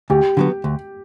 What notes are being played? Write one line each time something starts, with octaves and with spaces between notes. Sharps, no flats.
D2 G4
D3 F#3 B3
D2